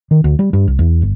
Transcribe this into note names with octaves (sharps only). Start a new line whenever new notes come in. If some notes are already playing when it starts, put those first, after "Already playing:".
D#3
D2
G3
G2
C2
E2
G1